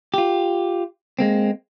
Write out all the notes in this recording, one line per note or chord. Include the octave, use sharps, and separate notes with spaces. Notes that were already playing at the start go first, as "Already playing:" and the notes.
F4 G4
G#3 A#3 C4